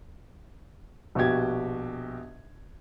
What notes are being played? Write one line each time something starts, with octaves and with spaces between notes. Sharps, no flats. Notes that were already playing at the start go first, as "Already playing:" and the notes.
A#1 B2 F#4 G4 G#6